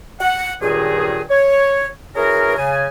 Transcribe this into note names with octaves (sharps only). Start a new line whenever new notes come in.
F#5
C#2 G2 A#2 D#3 D#4 G#4
C#5
E3 C#4 F#4 G#4 A#4
C#3 G#5